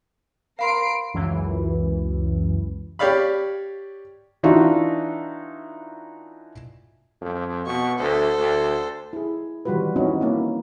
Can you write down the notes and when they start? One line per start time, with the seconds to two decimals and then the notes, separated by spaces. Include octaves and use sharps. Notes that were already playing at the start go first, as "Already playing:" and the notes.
0.59 A#4 F5 B5 C6 C7 D7
1.14 C#2 F#2 E3
2.99 G4 C#5 D5 F5 B5
4.43 E3 D4 D#4 F4 F#4 E5
7.21 F2
7.66 B2 C#6
7.99 D2 A4 C5
8.38 D2
9.13 E4 G#4
9.65 D#3 E3 G3 F4 F#4 B4
9.96 C4 C#4 D#4 E4 F#4
10.21 A#3 C#4 E4